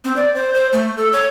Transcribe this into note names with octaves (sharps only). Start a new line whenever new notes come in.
C4
D5
C5
C5
A3
A4
C#5